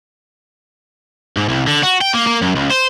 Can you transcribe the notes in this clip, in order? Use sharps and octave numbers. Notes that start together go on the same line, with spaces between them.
G#2
C2
D3
F#4
G5
A#3
A#3
F#2
C#2
C5